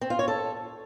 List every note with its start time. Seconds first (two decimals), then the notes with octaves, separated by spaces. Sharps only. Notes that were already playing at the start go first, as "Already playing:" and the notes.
0.01 C4
0.10 F4
0.19 C#5
0.28 A4